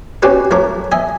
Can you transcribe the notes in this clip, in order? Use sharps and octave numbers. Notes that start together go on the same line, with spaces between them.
C4 C#4 F#4 G4 B4 D5
F2 A3 A#4 C#5 D6
D#5 E5 G#5